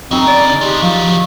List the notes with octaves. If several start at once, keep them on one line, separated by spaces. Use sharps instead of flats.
C#3 C4 D#4 G#4 D#5
D5
F3 G#3 G4
D#3 F3 F#3